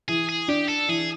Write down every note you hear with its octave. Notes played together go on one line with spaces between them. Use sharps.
E3 G#4
G#4
D4 G4
A4
E3 G#4